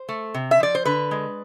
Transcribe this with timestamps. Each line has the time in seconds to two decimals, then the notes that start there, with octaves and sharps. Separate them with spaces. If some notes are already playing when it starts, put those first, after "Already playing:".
Already playing: C5
0.09 A3
0.34 C3
0.51 E5
0.60 F3 D5
0.75 C5
0.85 D3 B4
1.11 G#3